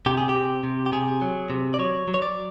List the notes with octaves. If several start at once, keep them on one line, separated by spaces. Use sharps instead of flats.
C3 G4
G#4
G4
C3
C3
G4
C3 G#4
F#3
C3
D5
F#3 C#5
F#3
C#5
D5